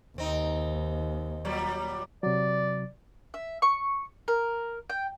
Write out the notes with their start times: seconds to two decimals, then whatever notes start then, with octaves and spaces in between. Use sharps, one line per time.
0.18 D#2 C4 D#4
1.45 A#2 F#3 G3
2.23 C3 F#3 D5
3.34 E5
3.62 C#6
4.28 A#4
4.90 G5